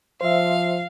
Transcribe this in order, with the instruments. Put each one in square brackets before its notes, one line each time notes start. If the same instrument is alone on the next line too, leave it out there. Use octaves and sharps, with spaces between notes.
[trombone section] F3 [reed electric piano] C5 E5 [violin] F5